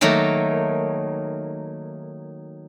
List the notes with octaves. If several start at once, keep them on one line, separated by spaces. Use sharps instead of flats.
D#3 F#3 A3 A#3